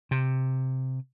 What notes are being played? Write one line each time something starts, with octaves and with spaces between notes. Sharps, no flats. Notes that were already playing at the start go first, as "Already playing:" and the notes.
C3